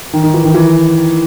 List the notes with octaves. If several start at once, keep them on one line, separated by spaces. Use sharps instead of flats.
D#3
D#3
E3
D#3
E3